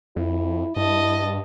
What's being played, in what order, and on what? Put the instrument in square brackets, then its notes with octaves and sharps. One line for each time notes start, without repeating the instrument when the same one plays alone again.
[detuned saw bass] F2 [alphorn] E4
[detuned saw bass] G2 [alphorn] E4 [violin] D#5 A5